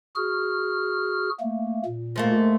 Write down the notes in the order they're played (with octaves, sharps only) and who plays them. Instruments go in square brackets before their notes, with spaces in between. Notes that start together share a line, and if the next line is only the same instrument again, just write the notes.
[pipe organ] F#4 G#4 F6
A3 A#3
A#2
[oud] G#2 A3 A#3